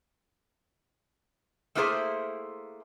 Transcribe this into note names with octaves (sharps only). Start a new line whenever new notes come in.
A3 A#3 E4 G#4 B4 C5